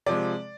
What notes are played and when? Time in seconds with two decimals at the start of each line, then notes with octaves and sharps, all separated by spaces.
0.06 C3 F3 G#3 D5